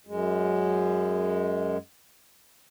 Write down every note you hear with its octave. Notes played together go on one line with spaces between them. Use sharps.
F#2 G#3